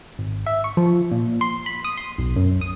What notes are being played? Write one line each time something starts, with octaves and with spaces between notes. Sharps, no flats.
G#1
E5
C#6
F3
A#2
C6
B5
D#6
C6
B1
F#2
D#6